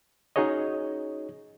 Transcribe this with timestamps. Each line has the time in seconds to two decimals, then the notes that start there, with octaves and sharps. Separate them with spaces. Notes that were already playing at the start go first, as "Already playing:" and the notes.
0.36 C#4 D#4 F#4 G#4 C#5 D#5